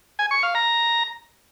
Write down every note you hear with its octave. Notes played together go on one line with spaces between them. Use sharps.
G#5
C#6
F5
A#5